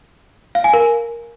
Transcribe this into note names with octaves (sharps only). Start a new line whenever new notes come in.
F5
G#5
A#4